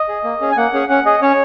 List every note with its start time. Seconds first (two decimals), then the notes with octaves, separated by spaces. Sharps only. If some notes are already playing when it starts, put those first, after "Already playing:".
Already playing: D#5
0.08 G#4
0.24 A#3
0.41 C#4 G#4
0.51 G#5
0.57 A#3 F#5
0.73 C#4 G#4
0.89 C#4 F#5
1.06 G#4 D#5
1.22 C#4 C#5